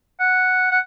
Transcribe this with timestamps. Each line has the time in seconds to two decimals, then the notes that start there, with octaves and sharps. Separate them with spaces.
0.20 F#5
0.71 F#5